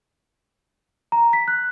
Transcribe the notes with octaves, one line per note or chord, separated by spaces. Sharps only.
A#5
B6
F#6